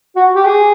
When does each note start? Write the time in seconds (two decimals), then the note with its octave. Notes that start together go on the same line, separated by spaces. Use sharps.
0.16 F#4
0.35 G4
0.46 G#4